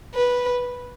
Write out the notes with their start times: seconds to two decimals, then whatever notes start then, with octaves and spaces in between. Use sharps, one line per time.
0.15 B4